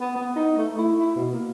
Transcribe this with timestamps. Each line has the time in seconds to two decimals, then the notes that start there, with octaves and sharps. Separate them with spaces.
0.01 B3
0.16 B3
0.36 D#4
0.58 A3
0.79 E4
1.00 E4
1.16 B2
1.33 A#3